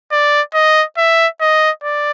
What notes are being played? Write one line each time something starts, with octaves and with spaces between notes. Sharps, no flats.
D5
D#5
E5
D#5
D5